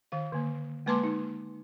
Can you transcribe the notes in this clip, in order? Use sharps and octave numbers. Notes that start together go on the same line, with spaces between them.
D#3 F5
D3 A#3
G#3 A#3 B4 A5 C6 D6
D#4